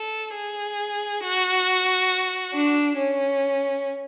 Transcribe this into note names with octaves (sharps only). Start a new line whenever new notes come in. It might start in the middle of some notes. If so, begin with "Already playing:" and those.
Already playing: A4
G#4
F#4
D4
C#4